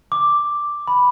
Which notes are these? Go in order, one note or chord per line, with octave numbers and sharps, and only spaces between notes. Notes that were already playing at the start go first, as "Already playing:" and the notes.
D6
B5